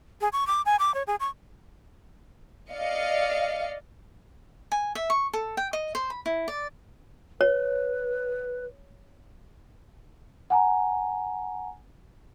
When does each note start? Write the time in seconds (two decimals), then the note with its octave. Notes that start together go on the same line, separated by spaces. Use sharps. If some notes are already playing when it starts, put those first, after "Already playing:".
0.21 G#4
0.33 C#6
0.47 D6
0.66 G#5
0.79 D6
0.94 C#5
1.07 G#4
1.20 C#6
2.71 D5 D#5 F5 C#7
4.72 G#5
4.95 E5
5.10 C#6
5.33 A4
5.57 G5
5.73 D#5
5.95 C5
6.10 B5
6.26 E4
6.48 D5
7.41 B4 C#5
10.50 F#5 G#5 A#5